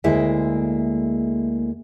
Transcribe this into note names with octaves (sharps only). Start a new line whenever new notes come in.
D2 G#3 A#3 E4 G#4 E5